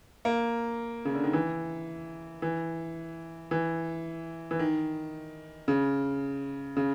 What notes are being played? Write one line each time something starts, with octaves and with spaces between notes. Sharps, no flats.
A#3
C#3
D3
D#3
E3
E3
E3
E3
D#3
C#3
C#3